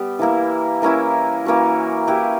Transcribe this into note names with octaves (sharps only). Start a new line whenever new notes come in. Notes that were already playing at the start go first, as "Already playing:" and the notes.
Already playing: G3 B3
E3 A#3 E4
E3 A#3 C#4 E4
E3 A#3 C#4 F#4
A#3 E4 G4 B4